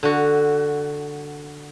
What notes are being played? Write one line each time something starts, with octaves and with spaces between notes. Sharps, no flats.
D3 F#4